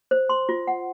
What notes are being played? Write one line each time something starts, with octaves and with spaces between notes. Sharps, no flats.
C5
C6
F4
F#5